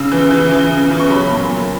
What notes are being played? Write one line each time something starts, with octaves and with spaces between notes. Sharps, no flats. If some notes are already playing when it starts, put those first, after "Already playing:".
Already playing: C#3 E6
E3
E3
E3
C#3
E3
C#6
F#3 B5
A#2
F#3